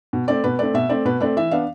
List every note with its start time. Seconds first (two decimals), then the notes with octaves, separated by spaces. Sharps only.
0.13 B2
0.28 A3 C4 D5
0.44 B2 B4
0.59 A3 C4 D5
0.74 B2 E5
0.89 A3 C4 D5
1.05 B2 B4
1.20 A3 C4 D5
1.37 E3 E5
1.51 B3 D4 F5